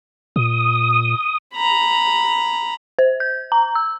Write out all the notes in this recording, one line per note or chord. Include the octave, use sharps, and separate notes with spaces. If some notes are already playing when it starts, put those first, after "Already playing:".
A#2 D#6
A#5 B5
C5
G6
A#5
E6